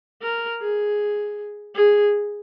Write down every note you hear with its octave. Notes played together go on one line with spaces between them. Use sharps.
A#4
G#4
G#4